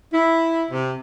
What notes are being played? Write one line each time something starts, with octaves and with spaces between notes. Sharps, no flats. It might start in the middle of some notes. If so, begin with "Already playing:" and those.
E4
C3